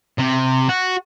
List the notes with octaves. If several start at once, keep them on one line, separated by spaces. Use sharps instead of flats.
C3
F#4